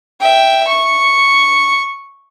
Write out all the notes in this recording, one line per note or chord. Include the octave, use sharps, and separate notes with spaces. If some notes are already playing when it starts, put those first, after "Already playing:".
E5 G5
C#6